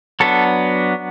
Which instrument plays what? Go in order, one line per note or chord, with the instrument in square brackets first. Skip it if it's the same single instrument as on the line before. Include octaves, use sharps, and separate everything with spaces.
[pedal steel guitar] F#3 B3 D4 A4